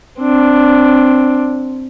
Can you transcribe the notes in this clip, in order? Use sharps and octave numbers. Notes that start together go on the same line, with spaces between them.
C4 D4